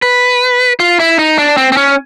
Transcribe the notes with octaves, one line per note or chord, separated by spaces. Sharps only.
B4
F4
E4
D#4
D4
C4
C4
C#4